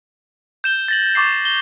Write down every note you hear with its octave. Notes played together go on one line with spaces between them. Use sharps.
G6 E7 G7
A6 A#6 F#7
C#6 D6 A6 C7
G7